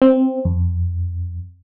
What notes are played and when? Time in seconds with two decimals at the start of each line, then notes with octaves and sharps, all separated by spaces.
0.02 C4
0.45 F2